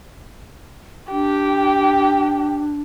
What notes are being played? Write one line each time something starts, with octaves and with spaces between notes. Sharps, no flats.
D4 G4